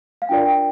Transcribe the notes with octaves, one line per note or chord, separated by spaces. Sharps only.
F5
D4 F4 A#4 D5 G5
G5